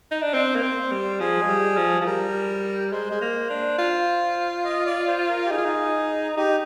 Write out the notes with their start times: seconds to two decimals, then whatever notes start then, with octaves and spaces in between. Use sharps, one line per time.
0.11 D#4
0.22 D4
0.34 C4 C5
0.56 A#3
0.63 C4
0.91 G3
1.20 F3 G#4
1.42 G#3
1.49 G3
1.77 F3
2.01 F3
2.06 G3 A#4
2.92 G#3 C5
3.11 G#3
3.21 A#3
3.50 D4
3.78 F4
4.64 D#5
4.86 D5
5.08 C5
5.29 A#4
5.46 G4
5.50 D#4 G#4
5.58 F4
5.65 D#4
6.37 D#4 G4